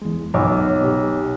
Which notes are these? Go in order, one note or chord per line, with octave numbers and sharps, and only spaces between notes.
E2 G#3
B1 C#5 D6
B2 G4